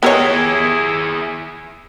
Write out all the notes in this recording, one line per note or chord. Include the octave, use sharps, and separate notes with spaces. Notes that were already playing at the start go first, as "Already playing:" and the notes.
B3 E4 G4 G#4 A#4 C#5 D#5 G#6